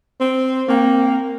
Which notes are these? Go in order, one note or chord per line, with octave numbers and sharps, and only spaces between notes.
C4
A#3 C4 G5